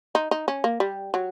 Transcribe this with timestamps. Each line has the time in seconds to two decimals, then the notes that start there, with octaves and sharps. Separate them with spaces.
0.15 D#4
0.31 D#4
0.48 C#4
0.64 A#3
0.80 G3
1.14 F#3